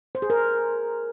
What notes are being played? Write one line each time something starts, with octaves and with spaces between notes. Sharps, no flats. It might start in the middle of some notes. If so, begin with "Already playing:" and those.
C5
G#4
A#4